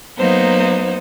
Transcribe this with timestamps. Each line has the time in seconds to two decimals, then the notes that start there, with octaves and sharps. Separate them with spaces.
0.18 F#3 A#3 B3 D#4 C5